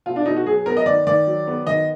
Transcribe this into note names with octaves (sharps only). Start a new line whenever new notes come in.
B2 F4
D4
B2 D#4
F#4
F#3 G#4
B3 A#4
D#5
D#3 D5
D#3 D5
F#3
B3
D#3 D#5